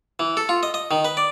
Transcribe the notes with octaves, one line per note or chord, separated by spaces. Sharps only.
E3
A4
F4
D#5
D#5
D#3
B4
D5